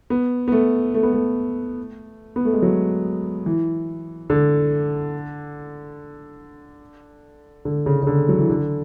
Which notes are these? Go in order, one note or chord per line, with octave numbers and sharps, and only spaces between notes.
B3
B3
A3
A3
B3
A3
B3
A3
G#3
F#3
E3
D3
D3
C#3
C#3
D3
F#3
E3
D3